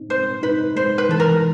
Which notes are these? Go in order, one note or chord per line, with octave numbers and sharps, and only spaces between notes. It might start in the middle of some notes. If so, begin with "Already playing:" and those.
Already playing: C4 D#4
G#3 C5
D#4 B4
G#3 C5
B4
E3 A4
A#4